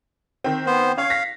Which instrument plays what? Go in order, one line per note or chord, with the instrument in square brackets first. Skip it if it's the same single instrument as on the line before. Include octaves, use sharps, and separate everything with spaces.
[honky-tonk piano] D#3 C4
[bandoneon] B3 C5
[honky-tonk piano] C#4 C#5 [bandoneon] F5
[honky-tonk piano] A#6 B6